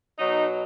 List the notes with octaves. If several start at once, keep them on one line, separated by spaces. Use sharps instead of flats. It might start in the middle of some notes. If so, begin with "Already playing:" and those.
B2 F#3 D#4